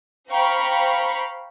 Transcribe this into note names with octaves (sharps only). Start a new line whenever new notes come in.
C5 F5 G5 A#5 B5 C#6